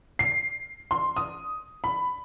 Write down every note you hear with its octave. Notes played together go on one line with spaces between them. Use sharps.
C7
C6
D#6
B5